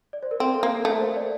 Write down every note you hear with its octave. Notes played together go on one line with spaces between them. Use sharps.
D5
C5
A#4
C4 A4
A4
A#3
A3 A#4
C5
D5